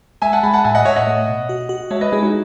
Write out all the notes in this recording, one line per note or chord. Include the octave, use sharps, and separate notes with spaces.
G#3 E5 G#5
F#5 A5
G#3 G#5 B5
F#5 A5
A2 E5 G#5
D#5 F#5
A2 C#5 E5
D#5 F#5
A3
B2
F#4
F#4
G#3 C#5 E5
B4 D#5
G#3 E4 G#4
D#4 F#4